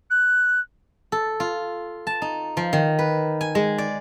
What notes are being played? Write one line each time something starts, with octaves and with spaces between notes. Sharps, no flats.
F#6
A4
F4
A5
D#4
F3
D#3
B4
G#5
G#3
D5